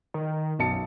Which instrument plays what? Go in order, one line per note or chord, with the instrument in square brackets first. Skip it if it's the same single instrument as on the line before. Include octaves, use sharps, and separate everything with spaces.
[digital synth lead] D#3
[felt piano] B1 A5 C#7 [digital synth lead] F#2